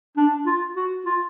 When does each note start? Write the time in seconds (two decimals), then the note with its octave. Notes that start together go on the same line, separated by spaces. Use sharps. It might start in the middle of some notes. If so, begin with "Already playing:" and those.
0.17 D4
0.46 F4
0.76 F#4
1.06 F4